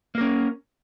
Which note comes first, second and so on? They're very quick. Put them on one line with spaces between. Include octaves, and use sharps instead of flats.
A#3 A#4 C#4